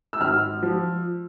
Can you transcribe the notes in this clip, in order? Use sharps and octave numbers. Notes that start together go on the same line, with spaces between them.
E6
G#1 F6
F3